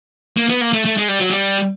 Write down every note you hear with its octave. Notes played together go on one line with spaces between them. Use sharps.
A#3
B3
A#3
A3
A3
G#3
G3
F#3
G3